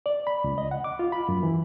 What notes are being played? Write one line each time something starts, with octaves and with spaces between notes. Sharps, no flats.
D5
B5
C#2
D#5
F#5
D6
F4
B5
F#2
E3